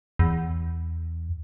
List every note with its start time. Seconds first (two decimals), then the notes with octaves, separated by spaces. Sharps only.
0.19 E2